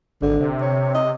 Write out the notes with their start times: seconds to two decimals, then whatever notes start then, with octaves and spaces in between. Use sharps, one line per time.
0.22 G#1 D3
0.41 C3
0.62 C#5
0.95 D#5